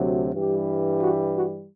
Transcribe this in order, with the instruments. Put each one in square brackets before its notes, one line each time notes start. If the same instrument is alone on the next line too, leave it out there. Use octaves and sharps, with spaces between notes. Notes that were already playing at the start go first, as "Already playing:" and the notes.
Already playing: [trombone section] D2 C3 F#3
G2 E3 G3 G4
F#4
F#4